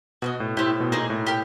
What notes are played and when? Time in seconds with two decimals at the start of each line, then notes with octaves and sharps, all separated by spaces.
0.22 B2 F#4 B4 D#5
0.40 A2
0.57 A2 C4 E4 G4
0.80 B2
0.92 A#2 A#3 D#4 G#4
1.10 A2
1.27 G4 A#4